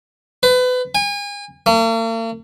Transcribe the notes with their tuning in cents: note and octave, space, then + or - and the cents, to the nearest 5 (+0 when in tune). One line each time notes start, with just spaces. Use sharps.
B4 +30
G#5 -35
A#3 -45